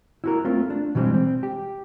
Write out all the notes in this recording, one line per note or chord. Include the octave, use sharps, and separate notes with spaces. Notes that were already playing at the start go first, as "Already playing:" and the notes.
E4 F#4 A#4
A3 A#3 C4 F4
D4
B2 E3 G3 G#3 C4
C4
G4